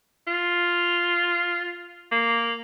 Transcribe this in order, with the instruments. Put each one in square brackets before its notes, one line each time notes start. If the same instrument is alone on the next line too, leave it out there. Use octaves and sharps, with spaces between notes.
[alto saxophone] F4
A#3